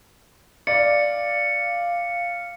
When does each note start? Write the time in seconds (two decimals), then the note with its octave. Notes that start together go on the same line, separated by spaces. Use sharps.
0.67 D5 F5 C#7